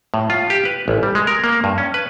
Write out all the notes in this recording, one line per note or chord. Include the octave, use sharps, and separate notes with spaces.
A2
F4
G4
B4
A1
G3
G#3
A#4
A#3
G2
C#4
B4